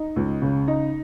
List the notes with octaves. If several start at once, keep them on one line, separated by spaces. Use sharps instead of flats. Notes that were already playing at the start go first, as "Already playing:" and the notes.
Already playing: D#4
C#2
C#3
D#4